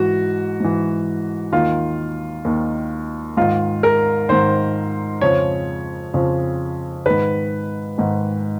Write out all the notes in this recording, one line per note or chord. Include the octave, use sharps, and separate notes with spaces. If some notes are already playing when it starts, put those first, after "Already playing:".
Already playing: G#2 E3 F#4
G#2 E3
D#2 D#3 F4
D#2 D#3
G#2 D#3 F4
A#4
G#2 D#3 C5
F2 C#3 F3 C#5
F2 C#3 F3
G#2 D#3 B4
G#2 D#3